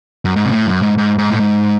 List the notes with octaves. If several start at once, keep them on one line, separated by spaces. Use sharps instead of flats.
F#2
G#2
C3
A2
F#2
G#2
G#2
G#2
A2
G#2